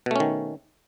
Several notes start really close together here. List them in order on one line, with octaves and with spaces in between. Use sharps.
B2 A3 C#4 D#3